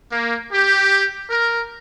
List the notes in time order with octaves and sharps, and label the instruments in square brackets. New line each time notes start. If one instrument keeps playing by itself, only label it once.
[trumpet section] A#3
G4
A#4